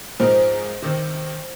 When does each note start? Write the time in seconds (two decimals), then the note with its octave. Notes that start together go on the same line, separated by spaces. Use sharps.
0.20 G#2 F3 C4 D#4 A#4 C5
0.82 C3 D#3 C4